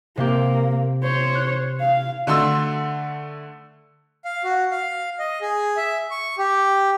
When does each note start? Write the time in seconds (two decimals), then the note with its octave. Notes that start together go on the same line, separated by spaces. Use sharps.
0.17 C3 A#3 C4 G4
1.03 C5 C#5
1.35 F#6
1.81 F5
2.27 D3 A3 C6 E6
4.25 F5
4.44 F#4
4.71 F5
5.19 D#5
5.41 G#4
5.77 E5
6.11 C#6
6.38 G4